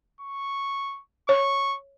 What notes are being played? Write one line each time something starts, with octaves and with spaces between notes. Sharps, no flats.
C#6
C#5 C#6